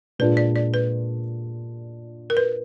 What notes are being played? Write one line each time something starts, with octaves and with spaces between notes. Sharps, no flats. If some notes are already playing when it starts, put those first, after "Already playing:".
A#2 G#3 D4 F4 B4
D5
D5
B4
A#4
B4